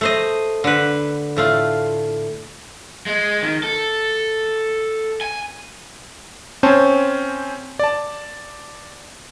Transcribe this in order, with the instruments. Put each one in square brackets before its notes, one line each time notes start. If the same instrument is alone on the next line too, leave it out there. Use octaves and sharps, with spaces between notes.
[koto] A3 C5 D#5
D3 B4
A2 A3 F4
[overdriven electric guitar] G#3
D#3
A4
G#5
[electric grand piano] C4 C#4 C5 C#5 A5
D5 A5